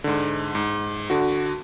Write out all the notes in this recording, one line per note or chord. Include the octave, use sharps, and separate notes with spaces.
G#2 D3
G#2
D3 F#4